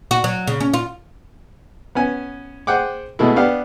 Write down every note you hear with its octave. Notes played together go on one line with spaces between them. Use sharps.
F#4
F#3
C#3
C#4
F4
B3 C#4 G#5
G#4 C5 F#5 G5 D6
B2 G#3 A3 E4
B3 D4 G4 F5